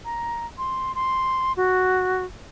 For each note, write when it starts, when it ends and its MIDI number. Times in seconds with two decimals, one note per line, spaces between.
0.05 0.45 82
0.58 0.94 84
0.95 1.53 84
1.57 2.25 66